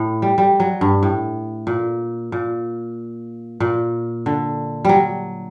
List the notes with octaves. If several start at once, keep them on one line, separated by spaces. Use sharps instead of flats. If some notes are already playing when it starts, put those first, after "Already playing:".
Already playing: A2
G3
G3
F#3
G2
A2
A#2
A#2
A#2
D3
F#3 G3